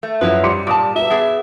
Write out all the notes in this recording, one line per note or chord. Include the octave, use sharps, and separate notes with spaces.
A3
F#2 F3 F#3 E4 B4
G3 C6 D6 C#7
A#2 A5 D6 D#6
F#4 B4 E5
B3 G#4